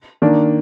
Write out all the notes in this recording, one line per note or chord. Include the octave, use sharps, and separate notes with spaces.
D#3 A#3 D4